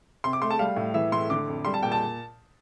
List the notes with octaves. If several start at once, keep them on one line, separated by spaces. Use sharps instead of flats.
C3 C6
D6
A3 C6
A5
G3 F5
A2
E3 E5
A2 C6
D3 D6
F2
G3 C6
A5
A#2 G5
A5